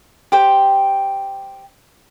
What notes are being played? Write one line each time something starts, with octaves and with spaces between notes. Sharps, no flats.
G4 C5 G5